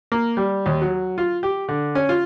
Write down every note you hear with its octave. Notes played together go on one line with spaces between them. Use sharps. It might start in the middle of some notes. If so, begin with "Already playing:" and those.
A#3
G3
D#2
F#3
F4
G4
D3
C#4
F4